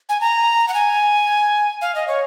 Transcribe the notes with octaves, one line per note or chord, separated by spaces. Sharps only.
G#5
A#5
F#5
G#5
F5
D#5
C#5